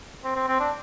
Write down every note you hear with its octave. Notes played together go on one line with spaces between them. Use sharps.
C4
C4
C4
D4